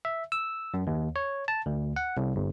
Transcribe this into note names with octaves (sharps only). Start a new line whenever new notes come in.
E5
E6
F#2
D#2
C#5
A5
D2
F#5
C2
G1